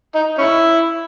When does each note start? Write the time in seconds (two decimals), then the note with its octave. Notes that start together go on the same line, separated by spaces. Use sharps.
0.15 D#4
0.38 C#4 E4